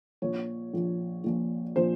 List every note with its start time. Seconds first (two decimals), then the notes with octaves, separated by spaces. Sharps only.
0.22 A#1 A#2 F3 C#5
0.73 A#1 A#2 F3
1.24 A#1 A#2 F3
1.76 A#2 F3 C5